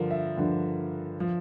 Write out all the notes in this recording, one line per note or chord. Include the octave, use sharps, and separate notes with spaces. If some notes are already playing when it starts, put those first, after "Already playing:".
Already playing: G2 D3 F3 A#4
E5
G2 D3 F3
F3